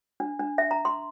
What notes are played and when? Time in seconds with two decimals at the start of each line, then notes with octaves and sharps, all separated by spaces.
0.20 D4
0.40 D4
0.58 E5
0.71 A#5
0.85 C6